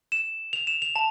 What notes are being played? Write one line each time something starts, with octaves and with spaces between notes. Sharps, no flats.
E7
F7
E7
F7
A5